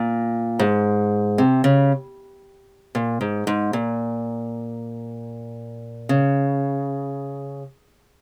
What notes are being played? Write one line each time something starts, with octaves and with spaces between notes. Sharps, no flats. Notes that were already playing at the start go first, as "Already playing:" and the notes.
Already playing: A#2
G#2
C3
C#3
A#2
G#2
G#2
A#2
C#3